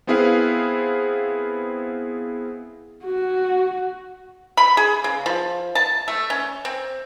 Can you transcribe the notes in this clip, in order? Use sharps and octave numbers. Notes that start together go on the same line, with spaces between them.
B3 C4 E4 G#4 B4 F5
F#4
B5
G#4
C#3
F3
A5
A3
C#4
C4